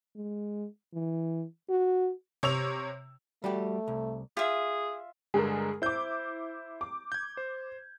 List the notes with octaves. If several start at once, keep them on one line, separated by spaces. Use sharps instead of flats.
G#3
E3
F#4
C3 C#5 E6 F7
G3 A3 F#4 G4
C2
F4 G#4 E5
G2 D3 G#3 G#4 A#4
E4 C5 D6 G6
D6
G6 G#6
C5